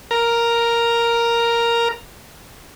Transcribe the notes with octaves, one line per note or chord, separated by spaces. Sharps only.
A#4 A#5